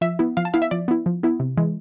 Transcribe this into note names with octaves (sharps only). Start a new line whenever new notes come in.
F3 E5
B3 E4
F3 F5
A5
B3 E4 F5
E5
F3 D5
B3 E4
F3
B3 E4
C3
E3 G#3